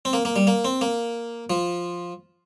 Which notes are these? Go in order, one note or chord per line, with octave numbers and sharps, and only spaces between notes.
C4
A#3
A#3
G3
A#3
C4
A#3
F3